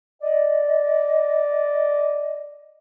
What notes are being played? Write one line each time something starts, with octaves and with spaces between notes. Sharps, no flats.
D5 D#5